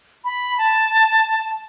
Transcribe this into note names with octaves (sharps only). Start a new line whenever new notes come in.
B5
A5